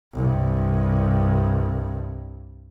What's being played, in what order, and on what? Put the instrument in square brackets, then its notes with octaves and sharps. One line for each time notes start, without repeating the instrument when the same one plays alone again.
[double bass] C2 G2